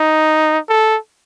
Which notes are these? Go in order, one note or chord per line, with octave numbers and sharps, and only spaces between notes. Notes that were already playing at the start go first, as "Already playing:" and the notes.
Already playing: D#4
A4